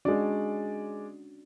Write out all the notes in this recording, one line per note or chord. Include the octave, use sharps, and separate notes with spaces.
G#3 C#4 D4 F#4 D5